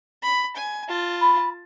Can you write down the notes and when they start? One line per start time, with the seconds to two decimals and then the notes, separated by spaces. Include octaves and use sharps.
0.23 B5
0.56 G#5
0.89 F4 A5
1.21 B5